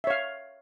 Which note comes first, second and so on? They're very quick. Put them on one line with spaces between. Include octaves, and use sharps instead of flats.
E5 C#5 F5